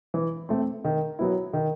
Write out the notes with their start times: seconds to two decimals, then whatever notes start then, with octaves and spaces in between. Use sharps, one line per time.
0.14 E3
0.49 A3 C4
0.84 D#3
1.19 F#3 B3 E4
1.53 D#3